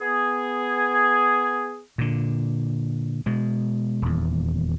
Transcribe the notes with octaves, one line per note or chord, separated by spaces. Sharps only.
B3 G#4
A#2 D3
B2 G#3
D#1 E2